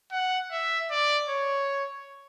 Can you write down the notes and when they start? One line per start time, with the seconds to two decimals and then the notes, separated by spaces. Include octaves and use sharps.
0.12 F#5
0.52 E5
0.91 D5
1.29 C#5